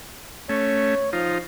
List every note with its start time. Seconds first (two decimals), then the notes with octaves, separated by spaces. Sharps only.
0.49 A3 C#4 C#5
1.13 F3 D#4 F4